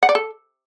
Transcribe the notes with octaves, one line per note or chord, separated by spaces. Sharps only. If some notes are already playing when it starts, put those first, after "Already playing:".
F#5
D5
A4